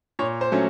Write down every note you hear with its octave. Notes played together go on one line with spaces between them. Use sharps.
A#2 C#5
C5
F#3 A3 C#4